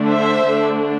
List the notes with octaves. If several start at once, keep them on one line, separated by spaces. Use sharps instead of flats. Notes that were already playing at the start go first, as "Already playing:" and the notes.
Already playing: D3 A3 D4
C5 E5
D3 A3 D4